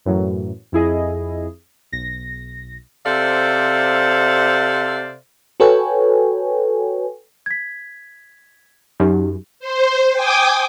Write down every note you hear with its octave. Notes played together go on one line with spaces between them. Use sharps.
F#2 A2 E3 F#3
F2 E4 G#4 D#5
B1 A#6
C3 A4 C5 D5 E5 F5
F#4 A4 B4 C#5 G5 G#5
G#6 B6
F#2 D#4 G4
C5
G5 G#5 D6 D#6